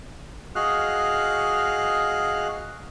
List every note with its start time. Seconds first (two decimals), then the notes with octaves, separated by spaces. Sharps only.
0.55 F#4 G#4 D#5 F5 F6 F#6